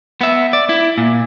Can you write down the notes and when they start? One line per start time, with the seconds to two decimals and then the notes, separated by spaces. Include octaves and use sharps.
0.21 B3 E5
0.53 D5
0.69 E4
0.98 A#2